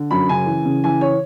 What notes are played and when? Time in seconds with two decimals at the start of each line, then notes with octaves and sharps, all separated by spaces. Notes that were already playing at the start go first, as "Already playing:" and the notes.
Already playing: D3
0.11 F#2 B5
0.29 C#3 G#5
0.46 E3
0.65 C#3
0.84 E3 G#5
1.01 C#5